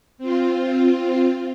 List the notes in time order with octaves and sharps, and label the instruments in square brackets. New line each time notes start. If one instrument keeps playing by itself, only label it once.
[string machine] C4 F4